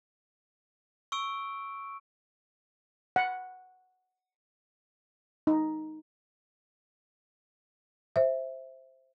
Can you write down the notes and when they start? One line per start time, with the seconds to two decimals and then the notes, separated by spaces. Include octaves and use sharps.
1.12 C#6 E6 D7
3.16 F#5
5.47 D#4
8.16 C5 E5